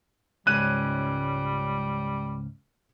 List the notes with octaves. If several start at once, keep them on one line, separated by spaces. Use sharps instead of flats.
C#2 G#2 G3 C#4 F#6 D#7